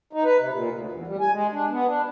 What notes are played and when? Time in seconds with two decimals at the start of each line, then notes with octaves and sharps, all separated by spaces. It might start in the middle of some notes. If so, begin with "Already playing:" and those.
0.13 D#4
0.24 B4
0.39 C3
0.53 A#2
0.72 D2
0.92 E2
1.07 G3
1.21 G#5
1.32 G#3
1.52 D4
1.71 B3
1.87 D4